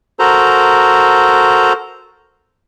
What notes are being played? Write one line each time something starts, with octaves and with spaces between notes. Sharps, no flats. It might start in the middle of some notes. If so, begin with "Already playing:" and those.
F#4 A4 A#4 C5 A#5